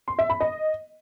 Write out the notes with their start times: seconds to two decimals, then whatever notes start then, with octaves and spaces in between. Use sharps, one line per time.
0.08 C6
0.19 E5
0.30 B5
0.41 D#5